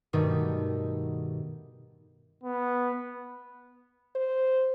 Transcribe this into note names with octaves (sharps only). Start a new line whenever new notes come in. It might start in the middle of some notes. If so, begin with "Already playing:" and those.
G2 B2 D#3 A3 D#4 G4
B3
C5